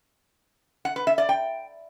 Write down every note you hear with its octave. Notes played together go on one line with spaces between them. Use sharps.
F#5
B4
E5
D5
G5